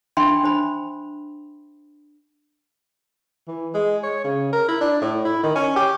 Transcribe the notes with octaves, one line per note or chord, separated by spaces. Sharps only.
D4 E5 G5 B5 C6
D4 C5 B5
E3
G#3
C#5
C#3
A#4
E4
D4
A2
E4
D#3
C#4
G4